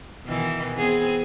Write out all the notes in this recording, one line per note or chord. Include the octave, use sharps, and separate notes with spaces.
B2 D#3 E3
B3 C4 G#4